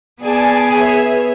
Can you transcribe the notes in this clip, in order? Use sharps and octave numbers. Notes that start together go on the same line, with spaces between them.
B3 G#4 D5 G#5 A5
B4 C#5 E5